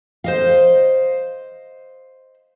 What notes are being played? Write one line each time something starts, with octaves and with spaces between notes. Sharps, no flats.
C5 D#5 F5